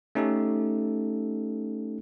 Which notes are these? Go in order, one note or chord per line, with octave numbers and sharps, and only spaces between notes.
A3 C#4 D#4 G4 A4